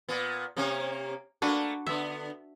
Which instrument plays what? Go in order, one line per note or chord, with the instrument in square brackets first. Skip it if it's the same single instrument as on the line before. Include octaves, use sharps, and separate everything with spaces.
[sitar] A#2 B3
C3 A#3 C#4
[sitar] A3 A#3 [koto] D4 F#4 B4
[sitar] D3 B3 [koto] E5